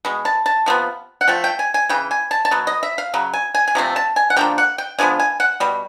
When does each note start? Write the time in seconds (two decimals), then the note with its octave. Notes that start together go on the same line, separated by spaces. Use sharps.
0.05 B2 G#3
0.25 A5
0.46 A5
0.66 C3 F3 B3
1.21 F#5
1.28 F3 A3 G5
1.44 G5
1.59 G#5
1.74 G#5
1.89 C#3 E3 G5
2.11 G#5
2.31 A5
2.45 A5
2.51 B2 F#3
2.67 D#5
2.83 E5
2.98 F5
3.14 C#3 F#3
3.33 G#5
3.55 G#5
3.68 G#5
3.75 C3 F3 A3 C4
3.96 A5
4.16 G#5
4.30 F#5
4.37 D3 F3 A#3 G5
4.58 F#5
4.78 G5
4.99 D3 F3 G#3 B3 G#5
5.19 G#5
5.40 F#5
5.60 B2 G3